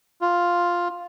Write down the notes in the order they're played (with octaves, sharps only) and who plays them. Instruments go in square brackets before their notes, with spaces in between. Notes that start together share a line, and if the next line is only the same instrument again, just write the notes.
[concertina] F4